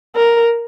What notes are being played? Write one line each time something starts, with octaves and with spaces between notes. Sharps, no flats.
A#4